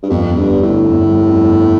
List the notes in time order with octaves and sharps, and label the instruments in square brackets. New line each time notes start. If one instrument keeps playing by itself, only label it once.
[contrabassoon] G2
[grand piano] G1 [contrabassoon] F2
[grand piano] G1
[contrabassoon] G2
[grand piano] G1
[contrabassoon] A2
[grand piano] D3
G1
G3
F2
G1